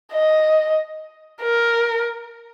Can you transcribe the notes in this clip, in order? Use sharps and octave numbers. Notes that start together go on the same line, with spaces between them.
D#5
A#4